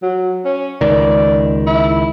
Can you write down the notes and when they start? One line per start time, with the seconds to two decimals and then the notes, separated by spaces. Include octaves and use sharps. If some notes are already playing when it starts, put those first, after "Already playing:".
0.03 F#3
0.45 C#4
0.81 C#2 D#3 D5
1.67 E4